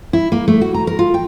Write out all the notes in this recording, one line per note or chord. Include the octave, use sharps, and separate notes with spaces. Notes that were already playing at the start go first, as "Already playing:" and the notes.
E4
A#3
A3
F#4
A#5
A#4
F4
G5